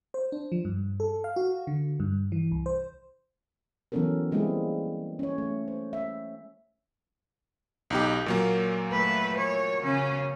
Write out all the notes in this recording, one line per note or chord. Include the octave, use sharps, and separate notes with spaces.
C5
D4
F3
G2
A4
F5
F#4
D3
G2
E3
C2
C5
E3 F#3 B3 C#4 A4 A#4
G3 G#3 A#3 C4 E4 G#4
C#4 C#5
A3
C5
E5
B1 D#4 G4
A#2 F#3 A#3
A3 B4
C#5
C#3 C#4